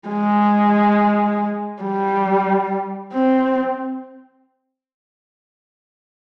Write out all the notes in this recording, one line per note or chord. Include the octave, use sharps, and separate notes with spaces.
G#3
G3
C4